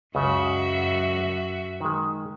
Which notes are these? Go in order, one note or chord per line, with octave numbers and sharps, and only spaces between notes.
C#2 F#2 C#3 F#4 E5
D#3 G#3